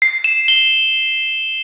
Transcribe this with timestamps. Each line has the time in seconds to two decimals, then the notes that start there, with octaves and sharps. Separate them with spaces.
0.02 C7
0.24 E7
0.48 G7